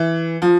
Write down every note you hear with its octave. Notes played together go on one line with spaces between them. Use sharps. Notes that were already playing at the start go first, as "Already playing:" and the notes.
Already playing: E3
F3